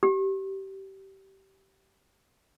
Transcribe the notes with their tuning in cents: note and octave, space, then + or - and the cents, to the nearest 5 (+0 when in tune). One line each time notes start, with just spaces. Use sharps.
G4 -20